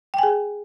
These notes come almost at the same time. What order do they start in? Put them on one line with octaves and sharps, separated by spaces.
G5 G#5 G#4